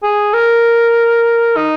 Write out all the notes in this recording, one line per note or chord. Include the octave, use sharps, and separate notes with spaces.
G#4
A#4
D#4